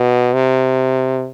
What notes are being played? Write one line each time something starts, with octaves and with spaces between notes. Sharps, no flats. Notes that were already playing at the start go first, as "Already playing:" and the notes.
Already playing: B2
C3